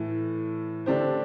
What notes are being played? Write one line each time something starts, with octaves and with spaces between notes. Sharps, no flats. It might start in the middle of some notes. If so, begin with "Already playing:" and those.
Already playing: A2 E3 A3
D3 A3 D4 G4 C5